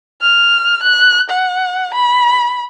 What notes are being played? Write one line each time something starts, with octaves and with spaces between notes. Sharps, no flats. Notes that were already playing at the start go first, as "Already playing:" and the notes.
F6
F#6
F#5
B5